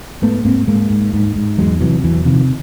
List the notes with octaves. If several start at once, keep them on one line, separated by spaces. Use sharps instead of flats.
G#2 A3 B3
G#2 A#3 C4
G#2 G#3 A#3
G#2
G#2
G#2
E2 F#3 G#3
C3 E3 F#3
E2 E3 F#3
C3 D#3 F3